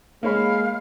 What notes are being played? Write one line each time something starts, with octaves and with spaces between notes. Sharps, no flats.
G#3 A#3 C#5 F5 B5